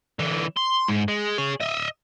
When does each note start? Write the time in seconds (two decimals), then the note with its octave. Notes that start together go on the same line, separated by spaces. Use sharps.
0.19 D3 E3
0.57 C6
0.88 G#2
1.08 G#3
1.38 G#4 C#5
1.60 D#5 E5